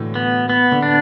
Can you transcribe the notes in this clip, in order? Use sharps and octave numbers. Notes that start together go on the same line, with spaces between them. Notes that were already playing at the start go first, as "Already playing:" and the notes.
Already playing: A2 D3 E3 F#3
B3
B3
D3
D4